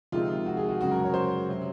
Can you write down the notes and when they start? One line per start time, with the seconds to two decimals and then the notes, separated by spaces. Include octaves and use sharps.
0.12 F2 C3 D#3 G#3 C4 F4
0.46 F#4
0.57 G#4
0.69 F#4
0.80 F#2 C#3 G#3 F#4
0.91 A#4
1.04 C#5
1.14 C5
1.48 C3 F#3 C#4